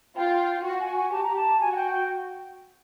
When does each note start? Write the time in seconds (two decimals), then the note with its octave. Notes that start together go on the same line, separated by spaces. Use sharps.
0.16 F4 G5
0.64 F#4
0.80 G#5
0.96 G#5
1.12 G4 A5
1.23 A#5
1.36 A5
1.61 F#4 G#5
1.72 F#5
1.76 G5
1.92 G5